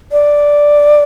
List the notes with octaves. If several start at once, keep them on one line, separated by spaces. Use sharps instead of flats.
D5